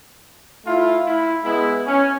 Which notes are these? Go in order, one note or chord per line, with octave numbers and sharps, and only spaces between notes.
A3 E4 F4
E4
G#3 B3 E4
C#4